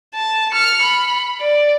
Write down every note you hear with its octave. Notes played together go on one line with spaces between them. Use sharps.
A5
F6 C#7
B5
D5